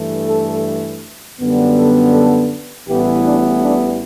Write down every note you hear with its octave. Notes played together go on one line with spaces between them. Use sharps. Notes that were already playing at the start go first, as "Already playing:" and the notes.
Already playing: G2 E3 A3
A4
F#2 D3 G3 B3
A4
A4
A1 A2 E3 G3 B3 G4
D4
D4